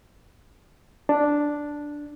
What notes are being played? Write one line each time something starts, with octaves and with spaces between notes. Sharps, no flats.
D4